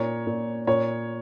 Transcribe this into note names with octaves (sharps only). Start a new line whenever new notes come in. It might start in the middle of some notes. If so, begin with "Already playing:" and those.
Already playing: A#2 C#5
A#2
A#2 C#5